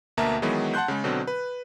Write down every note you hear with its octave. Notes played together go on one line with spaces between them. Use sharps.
D2 B2 A#3 E5 A5 A#5
D#3 E3 F#3 G#3 B3
F#5 A5 C6 F#6 G6
C#3 G#3
B2 D3 F#3 C4
B4